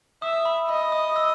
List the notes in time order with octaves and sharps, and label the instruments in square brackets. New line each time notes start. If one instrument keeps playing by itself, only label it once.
[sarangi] E5 [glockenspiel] D#6
[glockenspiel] B5
[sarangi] D#5 [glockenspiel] B5
[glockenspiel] D#6
E6